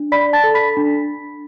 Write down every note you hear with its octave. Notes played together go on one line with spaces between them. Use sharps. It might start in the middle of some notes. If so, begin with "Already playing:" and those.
Already playing: D4
D5 B5 B6
A5 A6
A4
B5 B6
D4